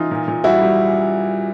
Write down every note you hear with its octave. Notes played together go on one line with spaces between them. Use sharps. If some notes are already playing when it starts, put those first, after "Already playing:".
Already playing: E3 D#4 F4
A#2
A#2
G3 E4 F#4
G3